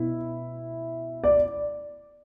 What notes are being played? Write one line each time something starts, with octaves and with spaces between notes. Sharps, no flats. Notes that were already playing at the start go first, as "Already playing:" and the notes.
Already playing: B2 E4
D5